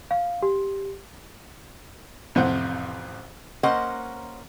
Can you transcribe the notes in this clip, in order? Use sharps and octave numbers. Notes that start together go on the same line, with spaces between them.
F5
G4
A1 F2 C3 C5 F#5
A#3 C#4 A#4 C5 D#5 F#5